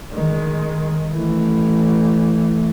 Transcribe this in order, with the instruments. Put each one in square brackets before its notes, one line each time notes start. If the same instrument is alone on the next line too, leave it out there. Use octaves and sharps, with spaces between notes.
[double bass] D#3 G#3
E3 A3